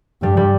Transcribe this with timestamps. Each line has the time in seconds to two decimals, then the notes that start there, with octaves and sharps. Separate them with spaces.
0.22 G2 G3
0.37 G3